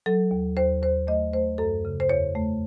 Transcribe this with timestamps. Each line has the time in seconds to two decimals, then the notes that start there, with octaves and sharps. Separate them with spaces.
0.06 F#3 A4
0.31 D#2
0.57 D#2 C5
0.83 D#2 C5
1.07 A3 D#5
1.33 A3 C5
1.58 F#2 A4
1.85 C#3
2.00 C5
2.09 E2 C#5
2.35 A3